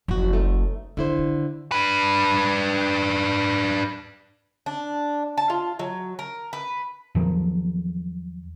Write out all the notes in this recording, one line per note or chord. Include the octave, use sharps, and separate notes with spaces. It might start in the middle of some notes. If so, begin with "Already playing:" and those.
F#1 F2 F#4
A3 D#4
D3 D#3 E4 C5
D#3
D4 B4
D4
A5
F4
F#3
A#4
B4
E2 D#3 F3 F#3